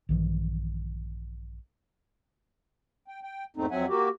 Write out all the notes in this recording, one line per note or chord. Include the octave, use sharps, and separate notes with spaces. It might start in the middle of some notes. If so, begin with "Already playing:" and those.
A#1 G2 D#3 E3
G5
G5
E2 G#2 A3 C4 D#4
F2 F#3 C4 E5 F#5 G#5
A#3 F#4 G4